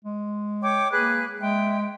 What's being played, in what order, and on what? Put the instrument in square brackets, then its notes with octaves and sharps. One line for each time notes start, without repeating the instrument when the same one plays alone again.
[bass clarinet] G#3
[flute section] C#5 G5 D6
[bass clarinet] A#3 [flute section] G#4 B4 F#6
[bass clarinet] G#3 [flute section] E5 G5